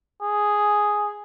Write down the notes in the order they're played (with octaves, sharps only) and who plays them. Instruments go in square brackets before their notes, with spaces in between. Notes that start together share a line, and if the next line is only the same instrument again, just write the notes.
[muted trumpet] G#4